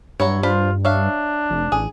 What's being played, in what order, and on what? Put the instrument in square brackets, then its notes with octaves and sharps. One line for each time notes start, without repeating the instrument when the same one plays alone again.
[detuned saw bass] G2 [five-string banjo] F#3 E4 C#5
[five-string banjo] D4 C5 B5 [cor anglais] F4
[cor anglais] D4 [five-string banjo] C#5 E5 F5
[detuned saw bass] F1
[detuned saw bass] A1 [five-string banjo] G#4